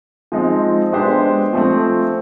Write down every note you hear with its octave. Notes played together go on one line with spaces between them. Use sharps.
F3 G#3 C4 D#4
G#3 B3 D4 G4 C5
F3 A3 C4